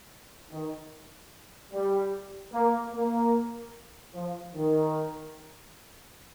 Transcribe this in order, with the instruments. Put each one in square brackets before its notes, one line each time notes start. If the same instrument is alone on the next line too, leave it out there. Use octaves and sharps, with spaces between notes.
[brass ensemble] D#3
G3
A#3
A#3
F3
D#3